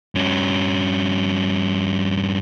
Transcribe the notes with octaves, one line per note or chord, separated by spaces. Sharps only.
G2 C#4